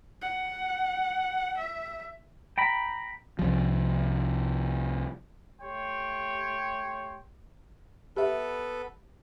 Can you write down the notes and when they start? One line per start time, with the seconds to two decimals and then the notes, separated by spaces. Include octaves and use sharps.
0.22 F#5
1.57 E5
2.58 G5 A#5 B5
3.39 C2 F3
5.62 A3 G4 C#5 G5 C6
8.17 B3 G4 A4 B4 E5